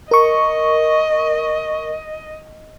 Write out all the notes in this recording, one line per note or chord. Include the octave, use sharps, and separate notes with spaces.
A#4 D#5 C#6